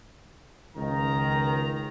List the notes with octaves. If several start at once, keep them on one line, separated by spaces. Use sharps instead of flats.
C#2 D#3 A#5